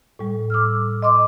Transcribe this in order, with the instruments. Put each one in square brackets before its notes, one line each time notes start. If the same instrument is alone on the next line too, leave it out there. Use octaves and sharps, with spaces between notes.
[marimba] A2 G3
D6 E6 F6
[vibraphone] D#5 C6 D6